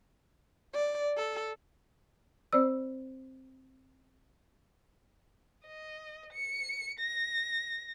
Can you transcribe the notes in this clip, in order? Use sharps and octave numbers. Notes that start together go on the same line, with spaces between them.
D5
A4
C4 C5 D5 E6
D#5
C#7
A#6